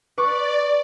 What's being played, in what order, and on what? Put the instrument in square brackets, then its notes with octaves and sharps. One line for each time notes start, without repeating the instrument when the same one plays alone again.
[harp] B4 C#6 D6 [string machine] D5